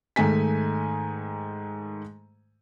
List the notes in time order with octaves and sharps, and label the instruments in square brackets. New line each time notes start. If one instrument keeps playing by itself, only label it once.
[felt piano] G#2 D#3 A3 G#5 B6